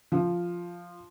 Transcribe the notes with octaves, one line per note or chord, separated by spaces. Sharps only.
F3